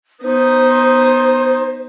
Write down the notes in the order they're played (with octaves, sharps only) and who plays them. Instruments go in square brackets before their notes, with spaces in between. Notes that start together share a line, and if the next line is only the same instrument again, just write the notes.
[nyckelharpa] B3 D#4 [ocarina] C5